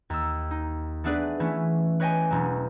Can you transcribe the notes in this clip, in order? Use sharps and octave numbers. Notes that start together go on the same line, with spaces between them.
D#2 E6
D#4
A3 B3 D4 G#4 B4 D5
E3 A3 C#4 E4 B4
B4 C#5 D#5 G5 G#5
E1 F#3